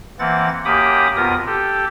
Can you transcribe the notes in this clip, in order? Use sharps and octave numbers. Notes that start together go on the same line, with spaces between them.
E3 A#3 C4 F#5 A6
F#2 A#3 G4 B5 D6 D#6
F2 B2 B3 F4 A#4 D#6
G4 A4